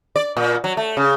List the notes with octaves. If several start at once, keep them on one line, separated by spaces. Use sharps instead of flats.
D5
A#2
F#3
A3
C#3